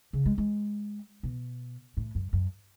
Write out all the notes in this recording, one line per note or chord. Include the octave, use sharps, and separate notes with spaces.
C#3
G#3
G#3
B2
A2
F#2
F#2